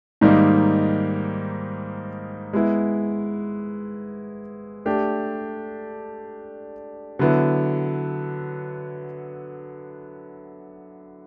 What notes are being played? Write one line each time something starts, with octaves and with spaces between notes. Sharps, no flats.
G#2 D#3 G3 A#3 D#4
G#3 B3 E4
A3 D4 G4
D3 F#3 B3 E4